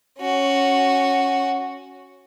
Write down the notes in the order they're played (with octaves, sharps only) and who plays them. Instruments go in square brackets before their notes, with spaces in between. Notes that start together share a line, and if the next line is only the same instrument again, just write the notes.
[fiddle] C#4 F#4